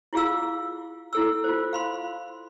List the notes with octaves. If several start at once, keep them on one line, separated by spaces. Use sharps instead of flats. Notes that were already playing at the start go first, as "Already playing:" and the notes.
E4 F4 G#4 F5 E6
E4 A4 E6
F4 C5
F5 B5 C6